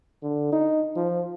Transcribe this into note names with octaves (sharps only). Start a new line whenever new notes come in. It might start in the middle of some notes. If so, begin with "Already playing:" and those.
D3
D#4
F3